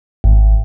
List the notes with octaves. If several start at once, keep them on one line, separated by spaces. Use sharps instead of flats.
G#1